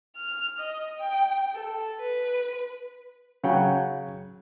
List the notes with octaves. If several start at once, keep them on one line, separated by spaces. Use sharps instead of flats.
F6
D#5
G5
A4
B4
C#3 F#3 C#5 F#5 G5